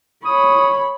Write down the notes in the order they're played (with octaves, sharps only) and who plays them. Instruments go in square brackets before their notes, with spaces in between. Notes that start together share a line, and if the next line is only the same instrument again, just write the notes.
[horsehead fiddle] C#5 B5 [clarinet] D#6